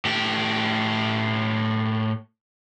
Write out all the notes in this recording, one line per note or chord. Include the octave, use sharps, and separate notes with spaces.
A2 G4